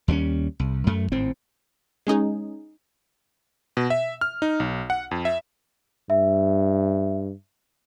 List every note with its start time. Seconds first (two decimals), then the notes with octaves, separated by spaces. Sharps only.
0.08 D#2 G3 G#3 C#4
0.59 C2
0.87 F#2 A3
1.12 G#1 A2 C4
2.07 G#3 C#4 D#4 G#4
3.77 B2
3.90 E5
4.21 F6
4.42 D#4
4.60 B1
4.90 F#5
5.11 F2
5.25 E5
6.10 G2 E5